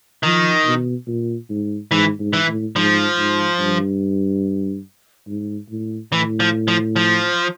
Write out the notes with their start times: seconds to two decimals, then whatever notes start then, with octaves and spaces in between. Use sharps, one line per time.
0.23 D#3 F3
0.66 B2
1.07 A#2
1.49 G#2
1.92 G#2 E3
2.19 G#2
2.33 E3
2.48 A2
2.76 G#2 F3
3.18 G#2
3.60 G2
5.28 G#2
5.70 A2
6.12 A2 E3
6.40 F3
6.68 F3
6.96 F3